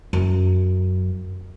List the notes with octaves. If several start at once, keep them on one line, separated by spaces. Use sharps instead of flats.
F#2